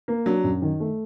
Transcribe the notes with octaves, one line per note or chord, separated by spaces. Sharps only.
A#3
F#3 D4
F#2
D#3
A3